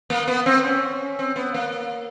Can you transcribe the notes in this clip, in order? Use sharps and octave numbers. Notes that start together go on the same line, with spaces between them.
A#3
B3
C4
C#4
C4
B3
A#3